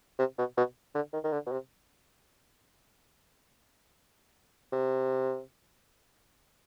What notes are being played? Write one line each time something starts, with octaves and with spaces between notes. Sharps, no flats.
C3
B2
B2
D3
D#3
D#3
D3
B2
C3
C3